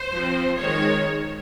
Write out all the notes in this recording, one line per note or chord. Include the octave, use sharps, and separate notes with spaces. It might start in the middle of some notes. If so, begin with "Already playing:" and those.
Already playing: C5
F3 C4
D#3 G#3 C#5